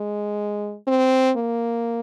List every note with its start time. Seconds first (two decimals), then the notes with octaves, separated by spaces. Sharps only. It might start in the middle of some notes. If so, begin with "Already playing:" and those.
Already playing: G#3
0.87 C4
1.37 A#3